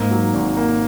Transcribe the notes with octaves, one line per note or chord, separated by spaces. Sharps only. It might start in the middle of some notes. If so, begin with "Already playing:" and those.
Already playing: G#2 A#3
F#3
G#1
A#3